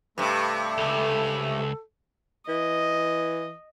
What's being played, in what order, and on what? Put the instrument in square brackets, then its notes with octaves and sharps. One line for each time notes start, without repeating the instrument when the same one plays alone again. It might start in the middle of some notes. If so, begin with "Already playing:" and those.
[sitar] G2 C3 [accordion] A3 [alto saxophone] B4
[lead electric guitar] C#2 [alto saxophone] A4
[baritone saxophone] E3 [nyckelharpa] D#5